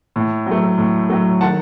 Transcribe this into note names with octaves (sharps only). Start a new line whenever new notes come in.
A2
F#3
A3
A2
F#3 A3
D#3 F#5 A5